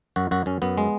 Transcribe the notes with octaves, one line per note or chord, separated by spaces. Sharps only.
F#2 F#4
F#2 F#4
F#2 C#4
F#2 B3
G#3